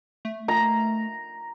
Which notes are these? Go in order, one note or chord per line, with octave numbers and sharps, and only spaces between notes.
A3
A#5